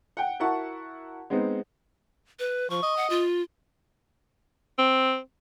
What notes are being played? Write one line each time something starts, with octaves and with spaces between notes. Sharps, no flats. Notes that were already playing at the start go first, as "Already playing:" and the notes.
F#5 G5
E4 F#4 A#4 F#5 A5 C#6
G#3 B3 C4 D#4
B4
F3 C#6
D#5
F#5
F4
C4